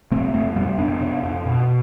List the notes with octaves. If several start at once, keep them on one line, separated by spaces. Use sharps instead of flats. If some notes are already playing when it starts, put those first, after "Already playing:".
C3 A3 C4
F2 A3 C4
C3 G3 B3
F2 B3 D4
C3
F2
B2